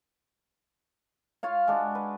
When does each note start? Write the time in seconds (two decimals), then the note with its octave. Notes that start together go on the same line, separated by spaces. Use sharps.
1.43 F4 C#5 F5
1.67 G#3 D4 F#4
1.95 B4